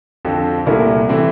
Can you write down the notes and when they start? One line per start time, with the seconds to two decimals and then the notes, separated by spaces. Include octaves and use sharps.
0.25 F2 D3 F3 C4
0.66 C2 A#2 A3 E4 A#4
1.09 E3 A3 C4 E4